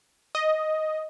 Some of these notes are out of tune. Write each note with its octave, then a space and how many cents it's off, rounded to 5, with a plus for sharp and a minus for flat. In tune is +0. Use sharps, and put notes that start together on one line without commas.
D#5 +5